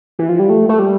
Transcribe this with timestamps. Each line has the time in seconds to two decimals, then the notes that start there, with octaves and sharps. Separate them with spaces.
0.19 E3
0.29 F3
0.39 G3
0.50 A3
0.69 A3
0.79 G3